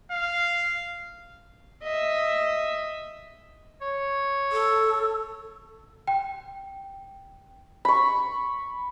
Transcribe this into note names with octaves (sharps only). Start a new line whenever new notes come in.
F5
D#5 E5
C#5
A4
G5
B5 C#6